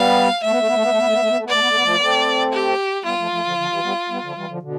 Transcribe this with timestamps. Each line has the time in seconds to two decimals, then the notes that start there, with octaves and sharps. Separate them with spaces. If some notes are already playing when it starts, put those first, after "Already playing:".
Already playing: G3 B3 F5
0.43 A3 E5
0.51 B3
0.60 A3
0.67 B3
0.75 A3
0.82 B3
0.91 A3
0.98 B3
1.06 A3
1.13 B3
1.21 A3
1.29 B3
1.37 A3
1.45 B3
1.49 A3 D5
1.60 B3
1.68 A3
1.75 B3
1.83 F3 A3
1.96 B3
2.01 A3 C4
2.53 G4
3.05 G3 B3 F4
3.18 F3 A3
3.31 F3 A3
3.45 D3 F3
3.57 D3 F3
3.70 E3 G3
3.84 G3 B3
4.09 G3 B3
4.23 D3 F3
4.36 E3 G3
4.49 D3 F3
4.62 B2 D3